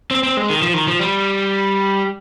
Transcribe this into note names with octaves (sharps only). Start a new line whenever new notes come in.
C4
C4
G#3
D#3
F3
D#3
F3
G3